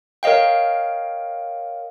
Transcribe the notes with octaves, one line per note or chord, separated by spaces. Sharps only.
A#4 C#5 D#5 F5 G5